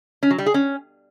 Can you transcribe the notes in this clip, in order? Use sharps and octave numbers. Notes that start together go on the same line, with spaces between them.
C#4
F#3
G3
G#4
C#4